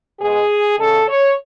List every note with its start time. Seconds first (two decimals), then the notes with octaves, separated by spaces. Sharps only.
0.20 B2 G#3 G#4
0.79 C#3 G#3 A4
1.08 C#5